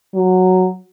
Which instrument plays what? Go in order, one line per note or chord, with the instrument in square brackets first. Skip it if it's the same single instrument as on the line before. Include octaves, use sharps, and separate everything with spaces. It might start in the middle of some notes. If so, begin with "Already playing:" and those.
[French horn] F#3